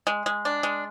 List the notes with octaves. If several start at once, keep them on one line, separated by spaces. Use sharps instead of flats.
G#3
G#3
D4
G#3